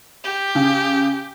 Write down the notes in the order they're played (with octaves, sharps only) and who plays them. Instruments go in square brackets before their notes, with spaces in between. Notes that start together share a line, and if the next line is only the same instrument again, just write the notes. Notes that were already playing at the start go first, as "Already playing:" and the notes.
[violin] G4
[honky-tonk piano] C#3